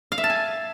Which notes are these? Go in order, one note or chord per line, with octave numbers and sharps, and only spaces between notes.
F5
E5
A5
G#5